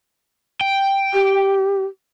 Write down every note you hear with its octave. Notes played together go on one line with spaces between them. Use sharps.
G5
G4